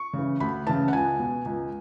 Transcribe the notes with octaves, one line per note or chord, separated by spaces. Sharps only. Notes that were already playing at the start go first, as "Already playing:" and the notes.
Already playing: C#6
C#3 E3
D2 B5
C#3 E3 A5
F#5
C#2 G#5
B2
C#2